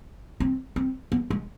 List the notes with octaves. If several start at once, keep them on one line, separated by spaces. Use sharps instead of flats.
C4
C4
B3
G#3